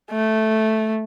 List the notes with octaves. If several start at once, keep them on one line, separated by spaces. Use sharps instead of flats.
A3